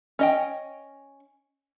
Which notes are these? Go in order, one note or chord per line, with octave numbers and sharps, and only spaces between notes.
C#4 D#5 G5